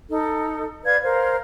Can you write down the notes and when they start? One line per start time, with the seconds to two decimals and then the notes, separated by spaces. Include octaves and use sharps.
0.09 D#4 A4
0.84 B4 D5 F5 G#6
1.03 A#4 C5 F5